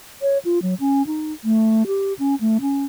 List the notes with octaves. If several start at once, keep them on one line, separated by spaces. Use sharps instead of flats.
C#5
F4
F#3
C#4
D#4
A3
G4
C#4
A3
C#4